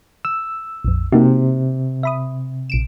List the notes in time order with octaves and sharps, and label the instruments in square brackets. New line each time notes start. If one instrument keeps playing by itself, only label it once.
[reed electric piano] E6
[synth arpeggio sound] A#1 F2
[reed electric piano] C3 [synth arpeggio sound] A#3 D#4 F#4
[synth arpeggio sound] E5 B5 D#6
A#1 D7 E7